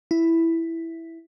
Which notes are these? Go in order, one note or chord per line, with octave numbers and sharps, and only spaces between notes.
E4